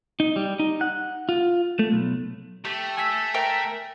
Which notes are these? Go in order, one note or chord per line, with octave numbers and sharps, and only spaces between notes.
D#4
G3
D#4
F#5
F4
A3
B1
A3 G4
G#5 E6 B6
A#4 E5 G5